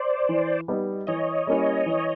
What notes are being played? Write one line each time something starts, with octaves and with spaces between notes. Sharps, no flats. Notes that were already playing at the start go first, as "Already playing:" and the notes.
Already playing: C5 D5
E3
G3 B3 D#4
E3 C#5 D#5
G3 A#3 C#4 E4
E3